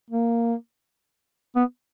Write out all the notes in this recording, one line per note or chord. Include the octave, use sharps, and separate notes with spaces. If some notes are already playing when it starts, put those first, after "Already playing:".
A#3
B3